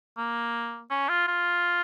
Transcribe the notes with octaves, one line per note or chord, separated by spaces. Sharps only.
A#3
C#4
F4
F4